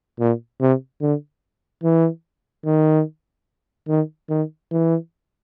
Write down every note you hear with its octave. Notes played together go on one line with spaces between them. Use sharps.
A#2
C3
D3
E3
D#3
D#3
D#3
E3